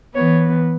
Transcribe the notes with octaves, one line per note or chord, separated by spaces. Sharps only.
E3 B3 C#5